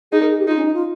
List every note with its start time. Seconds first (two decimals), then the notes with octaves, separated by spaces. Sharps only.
0.12 D#4 G#4
0.21 A#4
0.30 G#4
0.39 G4
0.47 D#4 F4
0.56 C#4
0.65 D#4
0.74 F4